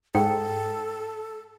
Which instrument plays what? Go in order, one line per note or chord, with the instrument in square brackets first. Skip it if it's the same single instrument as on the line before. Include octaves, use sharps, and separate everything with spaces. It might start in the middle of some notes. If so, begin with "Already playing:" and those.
[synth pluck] G#2 [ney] A4 [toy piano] G5